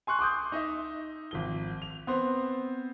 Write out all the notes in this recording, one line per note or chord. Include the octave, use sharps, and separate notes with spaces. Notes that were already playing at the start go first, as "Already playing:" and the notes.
G#5 C6 C#6 F#6
C6 D6 D#6 G6
D#4 D#5 E5
G#1 F3 G7
F7
B3 C4 C5